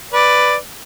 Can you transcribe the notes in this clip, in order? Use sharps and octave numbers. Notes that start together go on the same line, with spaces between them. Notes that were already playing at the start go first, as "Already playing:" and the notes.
B4 D5